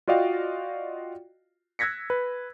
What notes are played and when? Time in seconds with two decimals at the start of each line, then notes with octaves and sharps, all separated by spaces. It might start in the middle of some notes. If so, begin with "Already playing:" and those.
0.08 F4 F#4 D5 D#5 F5 G5
1.79 E6 F#6 G#6 A#6 B6 C#7
2.10 B4